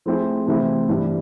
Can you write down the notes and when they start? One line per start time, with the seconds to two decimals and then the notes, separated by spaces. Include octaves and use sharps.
0.06 F3 A3 C4 E4 G#4
0.47 C3 E3 A3 C4 E4
0.89 G2 E3 G3